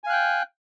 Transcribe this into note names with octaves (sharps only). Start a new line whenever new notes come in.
F5 G5 G#5 F#6